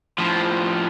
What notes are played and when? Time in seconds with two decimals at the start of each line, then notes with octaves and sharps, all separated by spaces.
0.18 A2 F3